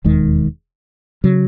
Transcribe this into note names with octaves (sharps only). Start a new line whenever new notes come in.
E1 D#2 D#3 G#3
C#3 F#3